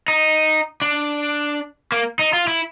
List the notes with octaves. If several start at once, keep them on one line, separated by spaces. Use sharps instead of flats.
D#4
D4
A#3
D#4
F4
E4